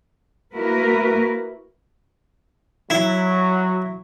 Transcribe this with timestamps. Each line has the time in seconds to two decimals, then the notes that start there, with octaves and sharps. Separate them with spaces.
0.55 A#3 E4 F#4 A#4 B4
2.90 F#3 E4